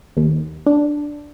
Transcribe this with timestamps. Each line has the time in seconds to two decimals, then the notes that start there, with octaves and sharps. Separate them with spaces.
0.17 D#2
0.66 D4